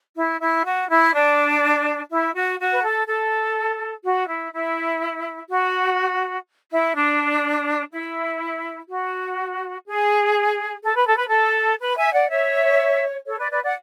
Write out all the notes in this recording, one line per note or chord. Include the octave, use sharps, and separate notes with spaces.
E4
E4
F#4
E4
D4
E4
F#4
F#4
B4
A4
A4
F#4
E4
E4
F#4
E4
D4
E4
F#4
G#4
A4
B4
A4
B4
A4
B4
E5 G#5
D5 F#5
C#5 E5
A4 C#5
B4 D5
B4 D5
D5 F#5